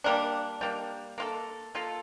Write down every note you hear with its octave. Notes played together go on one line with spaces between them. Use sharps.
G3 A#3 D4
G3 A#3 D4
A#3 F4 A4
A#3 F4 A4